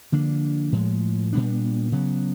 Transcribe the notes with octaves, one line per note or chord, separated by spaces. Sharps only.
D3 F3 A#3 D4
A2 F3 G#3
A#2 G3 B3 D4
C#3 F#3 B3